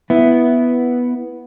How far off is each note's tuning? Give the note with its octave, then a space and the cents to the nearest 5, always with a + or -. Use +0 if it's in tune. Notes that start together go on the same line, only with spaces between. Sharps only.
B3 +0 E4 +0